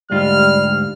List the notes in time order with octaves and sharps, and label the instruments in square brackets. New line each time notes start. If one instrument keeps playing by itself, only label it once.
[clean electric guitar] D2 G#2 F4 [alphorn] G3 [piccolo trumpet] F6